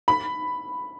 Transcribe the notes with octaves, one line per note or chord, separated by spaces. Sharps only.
B5